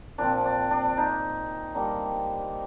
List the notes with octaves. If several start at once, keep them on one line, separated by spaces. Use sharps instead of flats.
A#2 F3 C4 D4
D4
D4
D#4
D3 G3 A#3